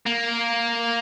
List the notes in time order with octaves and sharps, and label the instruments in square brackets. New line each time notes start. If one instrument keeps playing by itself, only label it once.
[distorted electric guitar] A#3